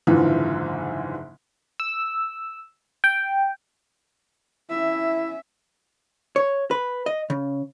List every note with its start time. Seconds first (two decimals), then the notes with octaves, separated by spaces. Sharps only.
0.07 F#1 G#2 D3 E3 F3
1.80 E6
3.04 G5
4.70 C#4 E4 E5
6.36 C#5
6.71 B4
7.06 D#5
7.30 C#3